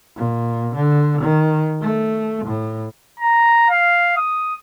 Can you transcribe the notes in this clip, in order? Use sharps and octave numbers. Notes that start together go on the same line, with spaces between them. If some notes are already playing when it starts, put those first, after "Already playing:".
A#2
D3
D#3
A3
A2
A#5
F5
D#6